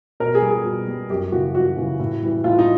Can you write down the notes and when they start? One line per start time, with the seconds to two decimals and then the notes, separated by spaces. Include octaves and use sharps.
0.20 B2 A#4
0.35 G#4
0.42 G3
0.50 G#4
0.64 B2
0.88 G3
1.10 F#2 G4
1.32 C#3 E3 G3 F#4
1.55 F#2 F#4
1.76 C#3 E3 G3
1.99 A2
2.22 E3 G3
2.44 A2 F4
2.59 D#4